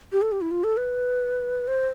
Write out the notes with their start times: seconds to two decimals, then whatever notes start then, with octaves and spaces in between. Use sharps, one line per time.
0.12 G4
0.22 A4
0.32 G4
0.41 E4
0.51 F4
0.64 A4
0.77 B4
1.68 C5